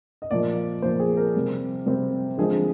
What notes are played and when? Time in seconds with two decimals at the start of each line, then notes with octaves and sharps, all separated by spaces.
0.22 D#5
0.31 A#2 F3 A#3 D5
0.82 A#2 F3 A#3 C5
1.00 G#4
1.17 A#4
1.34 C3 G3 C4
1.86 C3 G3 C4
2.38 D3 F3 G#3 C4 G#4